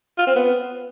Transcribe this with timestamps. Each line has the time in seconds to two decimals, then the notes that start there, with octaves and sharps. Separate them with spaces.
0.18 F4
0.27 C4
0.35 B3